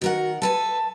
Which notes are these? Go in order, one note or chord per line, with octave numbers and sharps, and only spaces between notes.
D#3 F#4 A#4 F#5
A4 B4 G#5 A5